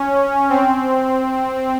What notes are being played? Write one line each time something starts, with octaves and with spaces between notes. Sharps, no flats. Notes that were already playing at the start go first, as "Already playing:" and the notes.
Already playing: C#4
C4